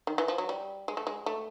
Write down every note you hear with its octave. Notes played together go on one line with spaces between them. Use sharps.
D#3
E3
F3
F#3
G3
G#3
A3
G#3
A3